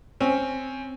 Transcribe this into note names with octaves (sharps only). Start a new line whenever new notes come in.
C4 C#4